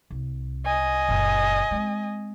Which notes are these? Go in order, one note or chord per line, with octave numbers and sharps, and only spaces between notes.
C2
D#5 G#5
F#1 A#2
G#3 C4